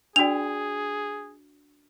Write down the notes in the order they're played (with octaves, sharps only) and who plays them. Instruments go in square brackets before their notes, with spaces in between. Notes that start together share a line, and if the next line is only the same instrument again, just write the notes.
[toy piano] D4 F#4 [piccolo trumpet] G#4 [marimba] D5 G5 E6 [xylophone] F7